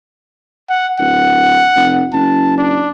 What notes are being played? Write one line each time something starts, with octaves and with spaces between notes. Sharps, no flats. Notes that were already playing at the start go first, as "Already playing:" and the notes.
F#5
D1 F#5
F1
F#1 A5
D4